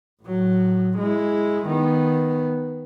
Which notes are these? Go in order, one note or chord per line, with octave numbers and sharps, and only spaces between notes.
A2 F#3
G#3 E4
D#3 B3